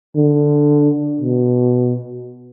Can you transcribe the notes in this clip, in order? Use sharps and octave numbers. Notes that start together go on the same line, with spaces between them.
D3
B2